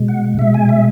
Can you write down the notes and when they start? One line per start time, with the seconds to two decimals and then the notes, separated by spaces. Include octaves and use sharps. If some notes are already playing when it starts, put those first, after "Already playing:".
Already playing: B2 G#3
0.08 F#5
0.39 B2 G#3 E5
0.54 G#5
0.69 E5